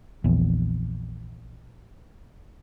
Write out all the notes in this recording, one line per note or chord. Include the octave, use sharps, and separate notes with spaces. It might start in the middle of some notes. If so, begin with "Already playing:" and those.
A#1 E2